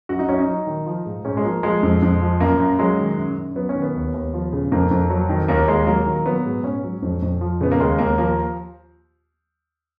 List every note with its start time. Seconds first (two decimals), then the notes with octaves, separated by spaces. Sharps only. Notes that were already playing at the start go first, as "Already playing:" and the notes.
0.09 F#2 F#4
0.19 D#4
0.29 F#2 C#4
0.38 D#4
0.48 F#3
0.67 D#3
0.86 F3
1.06 G#2
1.24 G#2 C#4
1.37 G#3
1.44 F3 A#3
1.63 F3 G#3
1.83 F2
2.02 F2
2.22 F3
2.40 F#2 A#3
2.60 F#2
2.79 F#3 G#3
2.98 D#3
3.17 F#2
3.37 F#2
3.56 F#3 B3
3.69 C#4
3.75 D#3
3.82 B3
3.95 D#2
4.14 D#2
4.34 F3
4.53 C#3
4.72 F2 A#3
4.91 F2
5.10 F#3
5.29 D#3
5.48 D#2 A#3
5.68 D#2 G#3
5.87 F#3 A#3
6.06 D#3
6.26 F#3 B3
6.46 G#2
6.64 G#2 C#4
6.83 F#3
7.02 F2
7.22 F2
7.41 F3
7.61 C#3 B3
7.72 A#3
7.80 D#2 G#3
7.99 D#2 A#3
8.18 F3 A#3